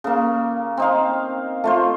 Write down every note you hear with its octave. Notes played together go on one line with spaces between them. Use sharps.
C#3 A#3
C4 D#4 F5
A3 F4 C5